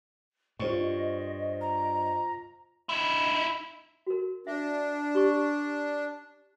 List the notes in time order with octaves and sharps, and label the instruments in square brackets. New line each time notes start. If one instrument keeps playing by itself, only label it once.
[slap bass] G2 [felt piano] F4 C5 C#6 [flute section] D#5
[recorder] A#5
[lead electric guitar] D#4 E4
[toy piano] F#4 A#4
[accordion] D4 [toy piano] E5
[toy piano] G4 C#6